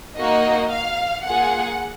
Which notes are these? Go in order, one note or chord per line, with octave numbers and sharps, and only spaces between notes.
A#3 D#4 F#4 D#5
F5
A#3 F4 G#4 F#5